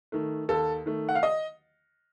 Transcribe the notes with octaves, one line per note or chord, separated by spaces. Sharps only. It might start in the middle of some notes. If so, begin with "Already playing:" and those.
D#3 A3
D#2 A4
D#3 A3
F#5
F5
D#5